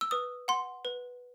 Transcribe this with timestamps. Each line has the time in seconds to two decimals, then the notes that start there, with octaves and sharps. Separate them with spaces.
0.01 E6
0.11 B4 D#6
0.48 F#5 C6
0.85 B4